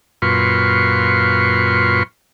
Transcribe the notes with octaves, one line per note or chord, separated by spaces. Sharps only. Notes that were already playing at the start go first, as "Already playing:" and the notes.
F#2 A#2 F4 B4 C6 C#6